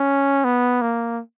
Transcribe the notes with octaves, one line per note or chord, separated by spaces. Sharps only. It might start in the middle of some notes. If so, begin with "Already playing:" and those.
Already playing: C#4
B3
A#3